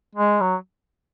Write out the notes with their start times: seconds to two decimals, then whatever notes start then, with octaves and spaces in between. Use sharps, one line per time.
0.15 G#3
0.41 F#3